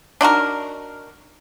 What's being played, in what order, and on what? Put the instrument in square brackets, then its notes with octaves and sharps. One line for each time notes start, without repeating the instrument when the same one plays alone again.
[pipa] D4 D#4 F#4 A#4